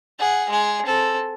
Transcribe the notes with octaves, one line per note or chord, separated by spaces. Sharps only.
G#4 F#5
G#3 G#4
C4 A4